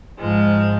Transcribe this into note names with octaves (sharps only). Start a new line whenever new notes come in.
G#2 F3 G#3